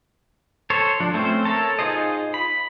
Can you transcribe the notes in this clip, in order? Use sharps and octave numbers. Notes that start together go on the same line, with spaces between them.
A4 C5 C#5
F3 D4
A3 C4 C#4 C5
A4 A#4 C#5 A5
D#4 F4 G#4 C5 D#5
B5